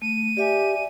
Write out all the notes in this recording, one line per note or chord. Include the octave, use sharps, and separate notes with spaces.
A3 D#7
G4 D5 E5 G#5